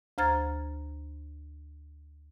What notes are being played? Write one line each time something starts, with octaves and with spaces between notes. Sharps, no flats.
D2 C5 A#5 F6 G#6 A6